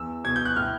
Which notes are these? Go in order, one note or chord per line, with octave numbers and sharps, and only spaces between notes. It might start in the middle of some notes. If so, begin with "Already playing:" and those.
Already playing: E2 E6
B2 G#6
G6
F#6
A2 F6